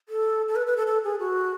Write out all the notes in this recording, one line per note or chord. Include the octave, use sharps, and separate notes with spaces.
A4
A4
B4
B4
A4
A4
G#4
F#4